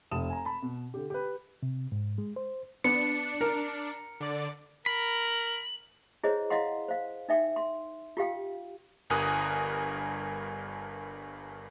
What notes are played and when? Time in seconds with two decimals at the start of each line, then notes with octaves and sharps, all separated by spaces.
0.11 F1 A5 D#6 E7
0.30 G#5 A#5
0.45 A5 B5
0.62 B2
0.94 D3 G4
1.10 G4 B4
1.63 C3
1.92 G#2
2.18 G#3
2.36 C5
2.84 B3 D4 C#7
3.41 A#4
4.20 D3 D5
4.86 A#4 B5 F#7
6.23 E4 G#4 C5 C#5 D#5
6.50 E4 D#5 F5 F#5 C6
6.88 C5 F5
7.29 D#4 E5 G5
7.56 C6
8.17 F4 G4 F5 G5
9.10 G1 G2 A#4 G#5 D#6 F#6